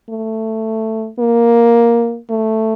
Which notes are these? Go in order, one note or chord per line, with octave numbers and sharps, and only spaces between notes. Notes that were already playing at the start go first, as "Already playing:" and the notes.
A3
A#3
A3